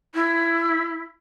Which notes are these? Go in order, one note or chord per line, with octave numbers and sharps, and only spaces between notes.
E4